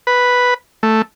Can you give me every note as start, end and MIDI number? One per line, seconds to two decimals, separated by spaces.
0.07 0.54 71
0.83 1.02 57